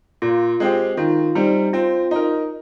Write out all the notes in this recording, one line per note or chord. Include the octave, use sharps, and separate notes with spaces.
A#2 F4
G#3 C4 G4
D#3 F4
G3 C4 D#4
C4 F4
D#4 A#4